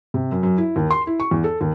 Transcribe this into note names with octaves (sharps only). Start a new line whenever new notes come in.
C3
F#2
F#2
E4
D#2
C6
E4
C#6
E2
A4
D#2